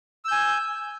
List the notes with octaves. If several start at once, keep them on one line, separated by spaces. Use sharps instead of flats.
G#5 E6 G6